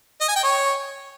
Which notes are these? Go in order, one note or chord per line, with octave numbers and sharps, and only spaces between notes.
D#5
G#5
G5
C#5